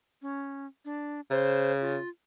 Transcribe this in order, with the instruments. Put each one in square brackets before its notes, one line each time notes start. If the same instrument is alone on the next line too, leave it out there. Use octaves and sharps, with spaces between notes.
[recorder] C#4
D4
[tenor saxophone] C#3 [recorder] C5
[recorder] F4